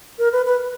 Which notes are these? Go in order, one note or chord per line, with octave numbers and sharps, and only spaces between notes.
A#4
B4
B4